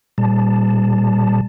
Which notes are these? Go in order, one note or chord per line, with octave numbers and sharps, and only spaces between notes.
A#2 G3 A5